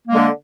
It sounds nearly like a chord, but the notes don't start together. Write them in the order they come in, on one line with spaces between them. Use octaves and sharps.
A#3 G#3 D3